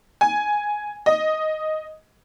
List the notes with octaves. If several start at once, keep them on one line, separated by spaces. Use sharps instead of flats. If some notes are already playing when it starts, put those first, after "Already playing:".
G#5
D#5